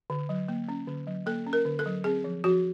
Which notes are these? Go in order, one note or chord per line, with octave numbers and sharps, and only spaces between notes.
D3
F#3
A#3
C#4
D3
F#3
A#3 A4
C#4
A#4
D3
A4
F#3
C4 G#4
F3
F3 F#4